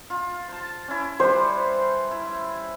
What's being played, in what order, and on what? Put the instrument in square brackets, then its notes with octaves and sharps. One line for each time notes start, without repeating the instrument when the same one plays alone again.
[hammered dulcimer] F4
C5 A5
C#4 E4
[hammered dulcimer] G3 B4 [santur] C5
[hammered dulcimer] E4